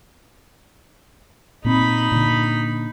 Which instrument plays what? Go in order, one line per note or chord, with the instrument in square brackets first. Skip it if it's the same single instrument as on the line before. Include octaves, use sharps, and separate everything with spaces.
[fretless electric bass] A#2 C4 [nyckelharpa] D#4 B5
[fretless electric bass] A#2 D3